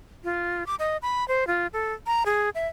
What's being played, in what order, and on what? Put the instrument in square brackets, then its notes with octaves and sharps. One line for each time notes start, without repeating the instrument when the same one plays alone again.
[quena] F4
D6
D#5
B5
C5
F4
A4
A#5
G#4
E5